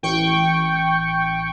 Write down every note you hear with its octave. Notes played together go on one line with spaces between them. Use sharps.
A1 G5 C#6